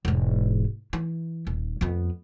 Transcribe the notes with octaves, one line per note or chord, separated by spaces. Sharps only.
E1 G#2
E3 E4
D#1
F2 B3